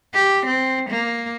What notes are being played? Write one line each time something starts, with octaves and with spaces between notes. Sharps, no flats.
G4
C4
A#3